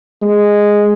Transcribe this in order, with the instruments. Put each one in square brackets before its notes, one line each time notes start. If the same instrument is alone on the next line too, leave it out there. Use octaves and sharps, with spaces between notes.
[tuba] G#3